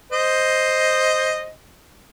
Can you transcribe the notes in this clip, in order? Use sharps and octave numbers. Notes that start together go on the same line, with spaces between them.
C5 D#5